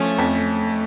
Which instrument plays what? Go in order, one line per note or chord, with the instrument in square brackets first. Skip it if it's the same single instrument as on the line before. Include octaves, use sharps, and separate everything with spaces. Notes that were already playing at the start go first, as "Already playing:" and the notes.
Already playing: [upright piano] F3 C#4 [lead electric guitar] A3
[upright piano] F2